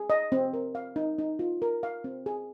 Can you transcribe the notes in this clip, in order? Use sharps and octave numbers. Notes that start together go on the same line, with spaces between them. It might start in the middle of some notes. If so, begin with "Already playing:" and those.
Already playing: G#4
D#5
C4
A#4
F5
D#4
D#4
F4
A#4
F5
C4
G#4